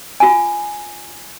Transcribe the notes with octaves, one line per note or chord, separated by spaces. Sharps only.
F4 G#5